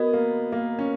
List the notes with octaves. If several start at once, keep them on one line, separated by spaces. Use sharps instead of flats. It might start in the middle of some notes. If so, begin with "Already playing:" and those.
Already playing: B3 F#4 A#4 D#5
A#3
A#3
C#4